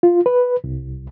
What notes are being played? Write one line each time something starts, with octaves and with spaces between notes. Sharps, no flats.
F4
B4
C2